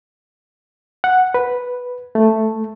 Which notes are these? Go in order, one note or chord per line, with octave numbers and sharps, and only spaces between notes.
F#5
B4
A3